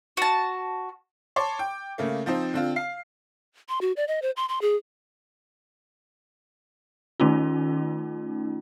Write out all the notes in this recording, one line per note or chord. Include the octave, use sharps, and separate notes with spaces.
F#4 A5
C#5 A5 C6 D6
G5
C#3 A3 A#3
F3 C4 D#4 C5
D3 C4 F4
F5 C7
C6
F#4
D5
D#5
C5
C6
C6
G#4
D#3 A3 C#4 D#4 F4